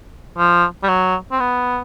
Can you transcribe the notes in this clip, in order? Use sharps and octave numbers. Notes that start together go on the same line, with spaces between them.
F3
G3
F#3
C4
B3